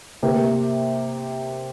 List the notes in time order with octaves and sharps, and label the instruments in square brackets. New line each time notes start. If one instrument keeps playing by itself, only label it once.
[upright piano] C3 A#3 G4